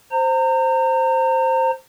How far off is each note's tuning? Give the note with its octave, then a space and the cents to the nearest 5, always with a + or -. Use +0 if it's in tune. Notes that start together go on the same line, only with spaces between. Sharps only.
C5 +0 A#5 -35